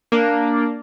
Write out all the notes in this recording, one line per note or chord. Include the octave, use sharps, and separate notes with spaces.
A#3 D4